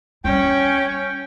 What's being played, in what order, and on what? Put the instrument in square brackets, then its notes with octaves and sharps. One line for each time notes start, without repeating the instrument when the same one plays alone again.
[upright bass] G3 [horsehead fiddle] C#4 [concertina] G5